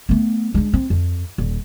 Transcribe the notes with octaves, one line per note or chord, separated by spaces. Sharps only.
A3 B3
G#3 D4
C4
F2
D#1